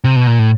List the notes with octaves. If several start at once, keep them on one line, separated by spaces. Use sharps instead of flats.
C3
B2
A#2
A2